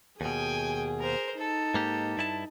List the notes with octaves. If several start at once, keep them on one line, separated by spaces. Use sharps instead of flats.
D#2 B2 G#4 G5 G#5
A#4 C5
D#4 A4
G#2 A#3 G4
G2 E4 A5